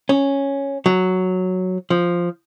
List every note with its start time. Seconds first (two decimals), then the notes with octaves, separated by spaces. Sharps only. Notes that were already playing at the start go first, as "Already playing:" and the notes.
0.09 C#4
0.86 F#3
1.90 F3